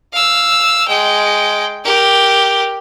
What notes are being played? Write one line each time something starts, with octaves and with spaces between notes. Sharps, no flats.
F5 E6
G#3 G5
G4 A#4